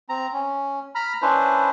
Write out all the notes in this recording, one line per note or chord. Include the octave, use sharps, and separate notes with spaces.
C4 A#5
C#4
A#5 B5 F6
C#4 D4 E4 B4 C5